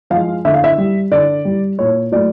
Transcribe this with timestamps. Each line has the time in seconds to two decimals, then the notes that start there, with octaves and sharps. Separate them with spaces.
0.10 F3 F5
0.16 G#3
0.45 D3 E5
0.54 F5
0.64 E5
0.78 G3
1.11 D3 D5
1.45 G3
1.79 A#2 C#5
2.12 F#3 A3 D5